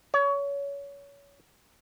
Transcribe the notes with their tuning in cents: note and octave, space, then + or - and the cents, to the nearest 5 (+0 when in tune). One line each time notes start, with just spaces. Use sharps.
C#5 +25